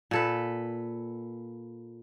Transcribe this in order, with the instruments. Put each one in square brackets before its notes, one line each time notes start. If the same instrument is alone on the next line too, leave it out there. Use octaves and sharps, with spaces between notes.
[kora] A#2 A4 B4